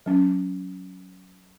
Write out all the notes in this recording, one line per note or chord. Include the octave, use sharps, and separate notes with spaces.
F#3 C#4